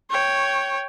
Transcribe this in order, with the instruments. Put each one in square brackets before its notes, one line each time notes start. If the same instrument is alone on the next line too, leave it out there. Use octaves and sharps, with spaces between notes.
[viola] C#5 G5